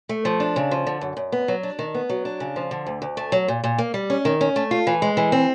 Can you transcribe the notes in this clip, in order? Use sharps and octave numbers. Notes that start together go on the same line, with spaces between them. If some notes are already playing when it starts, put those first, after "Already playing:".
A3
F3
D4
C#3
F3
D3
F#2
F#2
B3
F#3
D4
D#3
B3
F#3
D4
C#3
F3
D3
D2
D2
A3
F#3
A#2
A#2
A#3
G3
C#4
D#3
C#4
A3
F4
E3
G#3
E3
C4